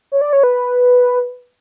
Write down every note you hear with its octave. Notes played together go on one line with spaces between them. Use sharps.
C#5
D5
C#5
B4